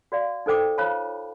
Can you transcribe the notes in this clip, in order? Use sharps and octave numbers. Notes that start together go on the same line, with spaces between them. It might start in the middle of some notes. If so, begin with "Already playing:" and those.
F#4 D5 F5
D#4 A4 C5 G5 D6
F4 C5 C#5 F5 A5 B5